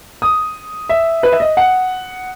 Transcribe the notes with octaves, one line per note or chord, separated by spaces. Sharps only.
D#6
E5
B4
E5
D#5
F#5